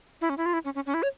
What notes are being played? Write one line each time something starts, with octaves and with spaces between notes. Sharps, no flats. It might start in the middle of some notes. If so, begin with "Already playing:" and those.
E4
C#4
E4
F4
E4
C#4
C#4
C#4
E4
C#5